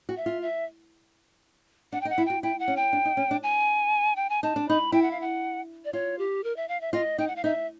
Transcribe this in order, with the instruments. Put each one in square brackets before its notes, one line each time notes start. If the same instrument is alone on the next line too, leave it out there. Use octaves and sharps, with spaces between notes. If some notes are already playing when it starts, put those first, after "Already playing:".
[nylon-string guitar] F#4
[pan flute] E5
[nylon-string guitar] F4
[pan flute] E5
[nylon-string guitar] D4 [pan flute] F#5
[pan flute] G5
[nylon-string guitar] D#4
[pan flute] F#5
[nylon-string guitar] E4
[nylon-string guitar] F#4 [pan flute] G5
[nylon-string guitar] E4 [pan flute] G5
[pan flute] F#5
[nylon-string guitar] C#4
[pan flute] G5
[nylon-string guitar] D4
D#4
C#4
D4
[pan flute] G#5
G5
G#5
[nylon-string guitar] D#4 [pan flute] A5
[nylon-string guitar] D4
[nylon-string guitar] D#4 [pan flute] B5
[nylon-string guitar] E4 [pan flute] G5
[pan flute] F#5
F5
F#5
D5
[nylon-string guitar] F4 [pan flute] C#5
[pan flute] G4
A#4
E5
F5
E5
[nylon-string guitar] F4 [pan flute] D#5
[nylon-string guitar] D#4 [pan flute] G5
[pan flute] F#5
F5
[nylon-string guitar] D#4 [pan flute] E5